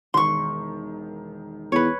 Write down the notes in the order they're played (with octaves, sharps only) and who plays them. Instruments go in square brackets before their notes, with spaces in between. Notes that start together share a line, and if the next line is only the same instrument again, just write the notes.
[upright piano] E1 D#3 [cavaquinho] C6 C#6
[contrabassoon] E2 [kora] B4 C#5